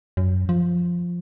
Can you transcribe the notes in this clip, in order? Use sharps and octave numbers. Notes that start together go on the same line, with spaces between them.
F#2
F3